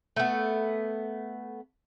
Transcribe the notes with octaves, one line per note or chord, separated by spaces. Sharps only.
A3 B3